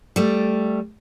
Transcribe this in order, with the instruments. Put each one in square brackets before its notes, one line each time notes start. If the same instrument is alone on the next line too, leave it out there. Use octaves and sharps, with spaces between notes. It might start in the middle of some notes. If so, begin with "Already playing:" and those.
[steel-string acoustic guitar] G3 A3